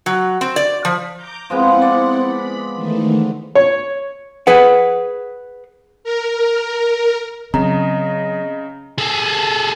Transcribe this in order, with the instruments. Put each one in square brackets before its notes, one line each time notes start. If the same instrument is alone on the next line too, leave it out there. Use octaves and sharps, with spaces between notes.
[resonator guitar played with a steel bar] F#3
C4
D5
F3
[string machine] A#5 D6 G6
[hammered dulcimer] F3 G#3 B3 [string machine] C4 E4 F#5
[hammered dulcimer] D5
[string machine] B5
D#3 E3 A3
[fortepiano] C#5
[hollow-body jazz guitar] G#4 B4 F#5
[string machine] A#4
[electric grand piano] C#3 [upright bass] F#3 C4 [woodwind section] D#5 [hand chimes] A#5
[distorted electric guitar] G#4 A4